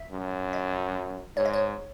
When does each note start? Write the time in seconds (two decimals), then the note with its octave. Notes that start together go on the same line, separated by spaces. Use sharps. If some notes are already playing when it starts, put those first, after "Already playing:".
Already playing: E5
0.11 F#2
0.53 D#5
1.37 G#2 C#5
1.45 D#5
1.53 C#5